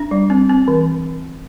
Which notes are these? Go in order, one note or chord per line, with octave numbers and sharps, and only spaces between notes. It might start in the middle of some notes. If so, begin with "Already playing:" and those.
Already playing: D4
G3
C4
C4
E3